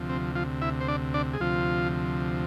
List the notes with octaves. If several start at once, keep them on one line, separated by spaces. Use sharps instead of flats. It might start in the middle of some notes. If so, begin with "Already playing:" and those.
Already playing: D2 C3 F3
C4
F3 F4
E4 E5
C5
D4 D5
D4 D5
G#4
D2 C3 F3 F4